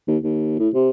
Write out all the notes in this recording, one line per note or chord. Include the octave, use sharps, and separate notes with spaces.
D#2
D#2
A2
C3